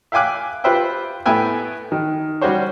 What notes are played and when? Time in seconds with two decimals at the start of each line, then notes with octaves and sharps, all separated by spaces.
0.12 E5 F5 G5 G#5 D6 F#6
0.64 F4 G4 B4 C5 E5 G5
1.26 A2 A3 B3 E5 G5 G#5
1.92 D#3
2.41 G3 C#4 F#4 G4 C5 C#5